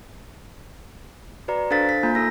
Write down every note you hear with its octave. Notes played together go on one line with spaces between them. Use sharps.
F#4 B4 D5 A#5
D4 A4 C5 F5 A6 B6
B6
A#3 F4 G#5 A#5 G6
D#4 A4 E6 A#6